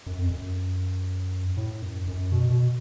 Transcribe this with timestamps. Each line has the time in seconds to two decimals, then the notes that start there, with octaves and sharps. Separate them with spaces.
0.07 F#2
0.18 F2
0.30 F#2
1.57 A2
1.82 F#2
2.07 F#2
2.32 B2
2.51 B2